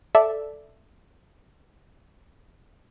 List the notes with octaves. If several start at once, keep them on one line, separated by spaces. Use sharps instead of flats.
A4 D5 E5